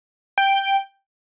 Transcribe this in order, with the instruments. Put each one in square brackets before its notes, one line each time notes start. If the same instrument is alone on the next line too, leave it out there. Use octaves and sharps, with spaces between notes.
[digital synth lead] G5